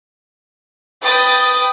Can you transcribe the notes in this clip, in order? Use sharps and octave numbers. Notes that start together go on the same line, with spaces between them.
B4 G5 D#6 A6